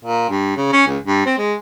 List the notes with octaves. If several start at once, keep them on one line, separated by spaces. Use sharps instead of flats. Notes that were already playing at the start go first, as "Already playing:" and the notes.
A#2
G2
C#3
C#4
C#2
G2
C4
G#3